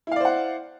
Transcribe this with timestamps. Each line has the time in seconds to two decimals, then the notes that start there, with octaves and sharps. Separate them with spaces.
0.07 E4
0.11 F5
0.16 D5
0.20 C5
0.25 F#5